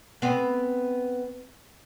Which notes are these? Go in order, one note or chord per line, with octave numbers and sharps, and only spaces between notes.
B3 C4